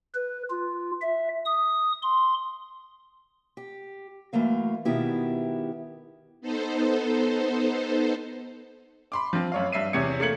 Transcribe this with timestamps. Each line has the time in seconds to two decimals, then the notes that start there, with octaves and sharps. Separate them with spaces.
0.14 B4
0.51 F4
1.02 E5
1.46 D#6
2.02 C6
3.57 G4
4.33 F#2 E3 A3 A#3 F5
4.85 B2 D#3 B3 E4 G4
6.41 B3 D#4 A4 C5
9.12 B5 C6 D6
9.33 F3 C4
9.52 F#2 C#5 F5
9.72 G2 E5 C7 D#7
9.93 E2 C3 C#5 G#6 C#7
10.20 A3 A#3 G#6 C#7 F#7